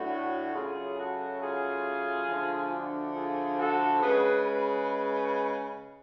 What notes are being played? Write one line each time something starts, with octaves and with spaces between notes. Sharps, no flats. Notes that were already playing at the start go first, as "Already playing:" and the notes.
Already playing: A2 F#3 A3 D4 F#4
C#3 F#3 A3 F4 G#4
F#4 A4
F4 G#4
D3 F3 A3
D4 F#4
F4 G#4
F#4 A4
C#3 G#3 G#4 B4
G#4 B4